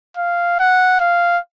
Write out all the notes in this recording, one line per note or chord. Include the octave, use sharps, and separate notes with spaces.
F5
F#5
F5